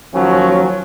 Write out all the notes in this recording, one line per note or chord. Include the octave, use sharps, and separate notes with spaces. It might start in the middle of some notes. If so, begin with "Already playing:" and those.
D#2 F3 F#3 C#4